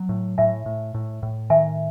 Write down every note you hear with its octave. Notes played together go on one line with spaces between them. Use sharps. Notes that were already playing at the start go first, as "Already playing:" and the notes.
Already playing: F#3
A2
A2 E5 G#5
A2
A2
A2
D#3 E5 G#5